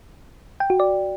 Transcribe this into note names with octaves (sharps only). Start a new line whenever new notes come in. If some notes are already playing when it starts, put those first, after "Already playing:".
G5
F#4
D5